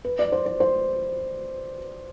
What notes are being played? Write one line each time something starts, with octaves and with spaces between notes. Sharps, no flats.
B4
D5
C5
C5
C5